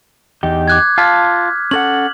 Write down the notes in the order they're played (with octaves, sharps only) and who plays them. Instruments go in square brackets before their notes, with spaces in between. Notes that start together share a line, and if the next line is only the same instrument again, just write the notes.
[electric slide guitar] E2 D#4 G4
[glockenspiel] D6 F#6 G#6
[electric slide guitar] F4 F5 A5 [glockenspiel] F6 B6
[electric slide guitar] C#4 A4 F#5 [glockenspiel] F#7